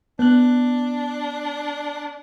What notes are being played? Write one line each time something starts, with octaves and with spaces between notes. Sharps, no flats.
B3 D4 F#6